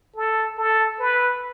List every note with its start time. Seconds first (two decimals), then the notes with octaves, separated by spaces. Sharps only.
0.16 A4
0.58 A4
1.00 B4